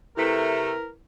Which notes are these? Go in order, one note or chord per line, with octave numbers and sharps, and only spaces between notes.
C3 A3 E4 A#4 B4 B6